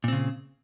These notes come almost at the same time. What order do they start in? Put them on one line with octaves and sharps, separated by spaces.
A#2 C4 C#3